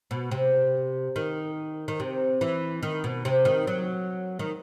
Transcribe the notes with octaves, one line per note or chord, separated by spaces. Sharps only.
B2
C3
D#3
D#3
C3
E3
D#3
B2
C3
D#3
F#3
D#3